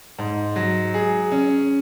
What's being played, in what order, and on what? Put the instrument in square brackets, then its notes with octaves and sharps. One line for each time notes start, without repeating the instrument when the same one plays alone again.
[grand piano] G#2
F#3
G#4
C#4